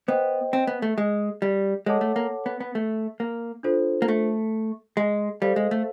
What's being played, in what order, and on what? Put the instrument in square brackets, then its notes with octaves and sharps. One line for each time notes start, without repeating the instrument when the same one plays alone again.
[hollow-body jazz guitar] B3 [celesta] C5 D#5 G5
[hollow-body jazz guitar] C4
B3
A3
G#3
G3
[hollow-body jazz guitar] G#3 [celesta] A4 C#5 F#5 A5 D6
[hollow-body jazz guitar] A3
A#3
B3
B3
A3
A#3
[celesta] D4 F4 A4 C5
[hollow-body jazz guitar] A#3
A3
G#3
[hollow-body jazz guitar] G3 [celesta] A4 C5 F5
[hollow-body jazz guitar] G#3
A3